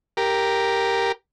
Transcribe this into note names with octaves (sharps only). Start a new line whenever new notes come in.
G4 A#4